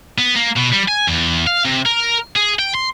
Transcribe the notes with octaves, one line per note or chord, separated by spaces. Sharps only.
B3
A#3
B2
G3
G#5
E2
F5
C3
A#4
G#4
G5
C6